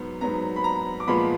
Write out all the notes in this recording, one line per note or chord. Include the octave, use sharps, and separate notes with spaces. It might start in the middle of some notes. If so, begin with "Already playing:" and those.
Already playing: G#2 F#3 B3
G#2 F#3 B3 A#5
B5
A#5
D6
A#2 F3 G#3 B3 B5